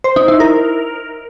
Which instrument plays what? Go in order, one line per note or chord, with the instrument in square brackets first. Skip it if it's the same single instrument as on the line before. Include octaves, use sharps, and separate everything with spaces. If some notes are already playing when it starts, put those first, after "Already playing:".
[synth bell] C5
D#4
E4
A#4